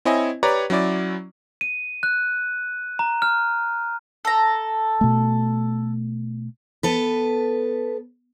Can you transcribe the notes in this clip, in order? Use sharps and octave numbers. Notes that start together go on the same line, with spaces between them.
C4 E4 C#5 D#5 G#5
G4 B4 C#5 D5 A#5
F#3 C#4 E4 D5
D#7
F#6
A#5
F6
A4 A#5
B2 A3
B3 A4 B4